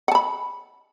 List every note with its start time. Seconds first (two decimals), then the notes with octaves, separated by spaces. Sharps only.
0.08 F#5
0.12 A5
0.15 B5